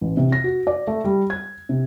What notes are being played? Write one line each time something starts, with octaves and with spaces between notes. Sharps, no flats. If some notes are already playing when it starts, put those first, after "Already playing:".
A1
C3
A#6
F#4
D5
A3
G3
G#6
C3